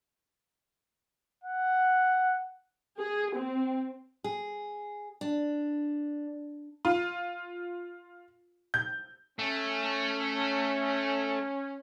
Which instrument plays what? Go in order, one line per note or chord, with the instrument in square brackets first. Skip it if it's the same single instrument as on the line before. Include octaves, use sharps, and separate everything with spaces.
[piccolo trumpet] F#5
[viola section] G#4
C4
[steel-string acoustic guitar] G#4
D4
[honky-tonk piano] F4
G6
[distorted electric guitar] A3 [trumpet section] C#4